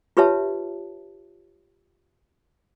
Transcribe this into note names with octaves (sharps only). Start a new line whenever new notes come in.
F4 G4 B4 C#5 E5 A5